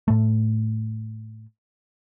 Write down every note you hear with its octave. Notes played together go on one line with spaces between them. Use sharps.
A2 A3